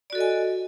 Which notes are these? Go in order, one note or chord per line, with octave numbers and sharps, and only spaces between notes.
F#4 A4 D5 D#5 G#5